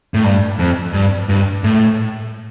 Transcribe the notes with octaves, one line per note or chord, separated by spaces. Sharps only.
A2
G2
F2
G2
G2
A2